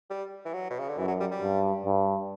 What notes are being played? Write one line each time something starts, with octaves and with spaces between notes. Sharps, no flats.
G3
E3
F#3
B2
C#3
D3
F#2 E3
F#3
G3
G3
G2
G2